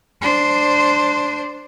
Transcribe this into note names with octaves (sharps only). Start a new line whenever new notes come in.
D4 C5